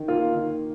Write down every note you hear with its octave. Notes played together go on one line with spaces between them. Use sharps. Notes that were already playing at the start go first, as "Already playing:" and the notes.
Already playing: D#3
A#3 F4
D#3